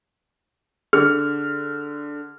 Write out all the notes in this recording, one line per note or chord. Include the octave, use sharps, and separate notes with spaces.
D3 G#4 F6